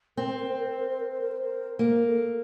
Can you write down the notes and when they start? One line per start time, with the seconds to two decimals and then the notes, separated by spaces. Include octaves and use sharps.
0.17 C4 A#4
0.28 C5
0.39 A#4
0.49 C5
0.59 A#4
0.69 C5
0.79 A#4
0.90 C5
1.00 A#4
1.11 C5
1.21 A#4
1.32 C5
1.42 A#4
1.79 A#3 A#4
2.06 A4